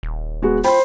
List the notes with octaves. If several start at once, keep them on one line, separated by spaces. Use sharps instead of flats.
D#1
G#3 B3 F#4
F4 C5 G5 B5